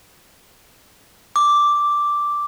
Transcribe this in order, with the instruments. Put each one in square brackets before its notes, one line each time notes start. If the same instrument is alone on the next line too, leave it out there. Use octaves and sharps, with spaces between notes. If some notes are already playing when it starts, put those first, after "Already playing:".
[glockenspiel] D6